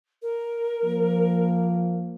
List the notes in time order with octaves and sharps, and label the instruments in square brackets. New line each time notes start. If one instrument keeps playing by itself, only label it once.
[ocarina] A#4
[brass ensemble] F3 A#3